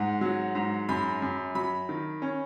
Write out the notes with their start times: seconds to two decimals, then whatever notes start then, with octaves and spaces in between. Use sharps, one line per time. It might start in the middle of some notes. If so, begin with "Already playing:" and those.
Already playing: G#2 F#5
0.21 F#3
0.55 G#2
0.89 F#2 B5
1.22 F#2
1.55 F#3 B5
1.89 D#3
2.22 C#4